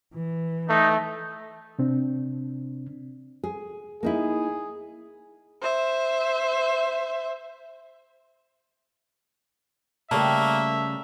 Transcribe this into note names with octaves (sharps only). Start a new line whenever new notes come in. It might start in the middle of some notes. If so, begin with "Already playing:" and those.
E3
A3 D#4
C3 C4 D4
G#4
A#3 D#4 E4 G#4
C5 E5
C#3 G3 A3 A#3 E5 A5 C#6